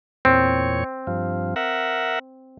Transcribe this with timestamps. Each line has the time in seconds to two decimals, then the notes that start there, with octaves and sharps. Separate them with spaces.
0.25 E2 A#2 C4 C#5
1.07 G2 F3
1.56 A#4 E5 F#5